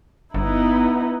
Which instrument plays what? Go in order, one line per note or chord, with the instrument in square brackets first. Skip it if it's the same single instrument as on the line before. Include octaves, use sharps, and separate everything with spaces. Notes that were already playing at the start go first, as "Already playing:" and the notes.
[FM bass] G1 [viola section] B3 D#4 E4